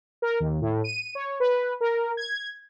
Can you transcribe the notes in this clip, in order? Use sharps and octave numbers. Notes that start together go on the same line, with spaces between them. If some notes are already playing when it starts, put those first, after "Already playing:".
A#4
D#2
A2
D#7
C#5
B4
A#4
G#6